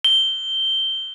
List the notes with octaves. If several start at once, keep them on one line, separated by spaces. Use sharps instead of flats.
G7